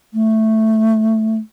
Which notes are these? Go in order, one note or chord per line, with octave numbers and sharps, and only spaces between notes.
A3